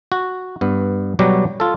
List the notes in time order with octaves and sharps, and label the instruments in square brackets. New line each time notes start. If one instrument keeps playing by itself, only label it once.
[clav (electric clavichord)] F#4
G2 B3
B2 F#3 G3 F#4 G4
F4 A4